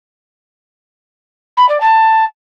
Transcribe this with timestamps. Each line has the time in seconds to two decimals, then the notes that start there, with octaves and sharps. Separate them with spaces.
1.57 B5
1.69 D5
1.81 A5